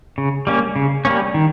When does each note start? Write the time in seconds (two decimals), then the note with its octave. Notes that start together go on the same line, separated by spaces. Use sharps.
0.18 C#3
0.47 G3 A#3 C#4
0.76 C#3
1.05 G3 A#3 C#4
1.34 D#3